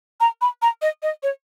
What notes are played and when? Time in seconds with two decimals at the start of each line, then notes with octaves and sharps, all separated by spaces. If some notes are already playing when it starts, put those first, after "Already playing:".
0.20 A#5
0.41 B5
0.62 A#5
0.82 D#5
1.03 D#5
1.23 C#5